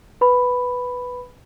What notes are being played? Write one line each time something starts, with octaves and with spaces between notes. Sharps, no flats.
B4 B5